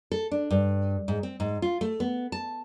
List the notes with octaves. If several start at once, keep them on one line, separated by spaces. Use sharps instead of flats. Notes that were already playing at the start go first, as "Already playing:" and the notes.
A4
D4
G2
G#2
C4
G#2
F4
A3
B3
A5